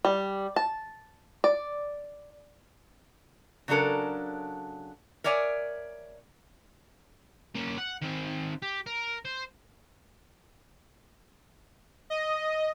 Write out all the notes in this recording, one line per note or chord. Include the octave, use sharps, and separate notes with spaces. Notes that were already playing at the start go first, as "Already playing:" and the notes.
G3
A5
D5
C#3 F#3 D4 A4 A#4
A#4 C#5 D5 E5 G#5
A#3 C#4
F#5
D#3 C4
G4
A#4
C5
D#5